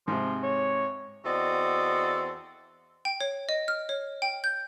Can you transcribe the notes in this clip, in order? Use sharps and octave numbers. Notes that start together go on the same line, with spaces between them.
G#2 C3 F3
C#5
E2 C4 F#4 A4 D5 D#5
G5
C#5
D#5
F6
C#5
G5
G6